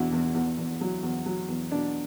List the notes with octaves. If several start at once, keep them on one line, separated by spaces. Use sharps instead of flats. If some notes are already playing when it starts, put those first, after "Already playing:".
Already playing: E2 B2 D4 E4 F#4
E2
E2
E2
F#3
E2
F#3
E2
B2 D4